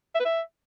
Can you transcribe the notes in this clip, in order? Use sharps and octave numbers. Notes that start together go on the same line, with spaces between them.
E5
B4
E5